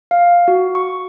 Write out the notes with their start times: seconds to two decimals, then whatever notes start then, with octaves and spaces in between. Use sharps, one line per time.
0.11 F5
0.48 F#4
0.75 C#6